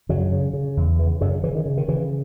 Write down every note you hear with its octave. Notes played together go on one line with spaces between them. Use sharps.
F#2 C#3 F#3
C#3
C#3
E2
C#3 E3
F#2 C#3 F#3
C#3 E3
D#3
C#3
D#3
C#3 E3